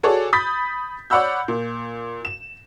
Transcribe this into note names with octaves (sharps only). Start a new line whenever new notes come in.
F#4 G#4 A4 C#5 D5
B5 D#6 G6 A6 B6
C#5 D5 F#5 B5 E6 G6
A#2
E7